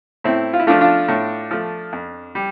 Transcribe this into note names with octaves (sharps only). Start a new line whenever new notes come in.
A2 C4 E4
F4
E4
F3 A3 D4 F4
D4 F4
A2
F3 A3
F2
G3